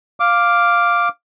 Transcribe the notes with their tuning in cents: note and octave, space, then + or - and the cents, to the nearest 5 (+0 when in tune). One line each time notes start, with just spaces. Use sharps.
F5 +0 D6 +0